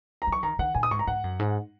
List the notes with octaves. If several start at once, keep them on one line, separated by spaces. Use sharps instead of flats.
A#5
F#3
C#6
D#3 A#5
D#3 F#5
A#2 G#5
D#6
G#2 C#6
A#5
G#2 F#5
F#2
G#2